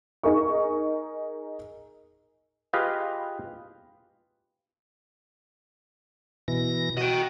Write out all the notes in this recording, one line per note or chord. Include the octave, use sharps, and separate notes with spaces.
D#4 G#4 A#4 C#6
F4 G4 G#4 B4 D#5 F5
B2 E3 A#6
F#4 D#5 G5